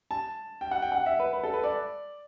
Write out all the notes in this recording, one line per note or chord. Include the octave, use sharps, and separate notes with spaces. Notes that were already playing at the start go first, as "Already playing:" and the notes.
A5
G5
F#5
G5
F#5
E5
B4
B4
A4
B4
D5